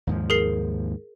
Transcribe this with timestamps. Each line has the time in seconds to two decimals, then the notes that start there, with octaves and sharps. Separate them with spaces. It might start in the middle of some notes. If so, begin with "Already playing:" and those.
0.07 D#2 G#2 F3
0.30 G#4 A#4 C7